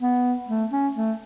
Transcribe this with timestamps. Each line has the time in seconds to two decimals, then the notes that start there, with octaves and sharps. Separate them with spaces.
0.01 B3
0.49 A3
0.72 C#4
0.96 A3